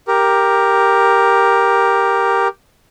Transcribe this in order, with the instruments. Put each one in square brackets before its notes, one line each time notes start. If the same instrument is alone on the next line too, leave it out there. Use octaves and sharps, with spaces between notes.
[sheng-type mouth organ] G4 A#4